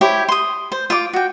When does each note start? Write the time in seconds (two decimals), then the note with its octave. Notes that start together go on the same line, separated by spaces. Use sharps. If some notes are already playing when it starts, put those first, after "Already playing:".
0.01 E4 G4 C5 C#5
0.29 C6 D#6
0.72 C5
0.90 F4 D6
1.13 F#4 G5